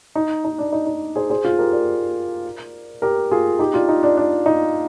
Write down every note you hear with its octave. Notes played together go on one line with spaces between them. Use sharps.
D#4
D#4
D4
D#4
D#4
G#4 C5
G#4 C5
F4 G#4
G4 A#4
A#4 D5
G4 A#4
F4 G#4
D#4 G4
D4 F4
D#4
D4
D4
D#4